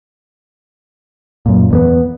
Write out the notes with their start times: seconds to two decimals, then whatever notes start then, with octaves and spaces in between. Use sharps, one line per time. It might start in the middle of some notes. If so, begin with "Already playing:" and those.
1.46 F#2 A#2
1.71 E2 A#3 B3